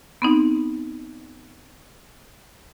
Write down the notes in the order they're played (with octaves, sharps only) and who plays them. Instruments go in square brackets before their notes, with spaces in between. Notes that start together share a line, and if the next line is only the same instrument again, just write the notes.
[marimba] B3 C4 D#4